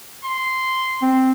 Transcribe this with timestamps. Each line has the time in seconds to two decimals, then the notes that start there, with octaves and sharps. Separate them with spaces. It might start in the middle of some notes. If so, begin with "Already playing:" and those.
0.24 C6
1.02 C4